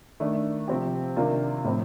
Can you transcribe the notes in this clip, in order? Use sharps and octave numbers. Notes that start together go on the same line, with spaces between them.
D#3 A3 D4
C3 F3 C4 G4
C3 D#3 A#3 D4 F4
A2 F3 C4